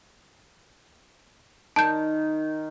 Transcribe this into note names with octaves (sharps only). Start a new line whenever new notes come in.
D#3 A5 G6